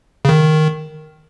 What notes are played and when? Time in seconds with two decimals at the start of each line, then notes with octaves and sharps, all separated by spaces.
0.25 C#3
0.29 D#3